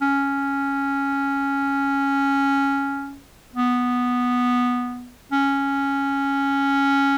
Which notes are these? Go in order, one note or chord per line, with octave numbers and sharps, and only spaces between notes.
C#4
B3
C#4